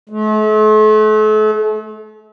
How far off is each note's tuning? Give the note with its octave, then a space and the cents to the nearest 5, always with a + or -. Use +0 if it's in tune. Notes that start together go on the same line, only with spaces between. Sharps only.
A3 -40